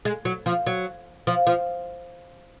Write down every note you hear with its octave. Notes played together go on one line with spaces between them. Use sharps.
G#3
F#3
F3
F#3
F3
F3